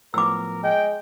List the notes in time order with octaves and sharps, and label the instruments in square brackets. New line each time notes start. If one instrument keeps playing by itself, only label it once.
[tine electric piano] A2 F3 B3 [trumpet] A#4 [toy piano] D6 E6
[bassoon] G#3 [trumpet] G5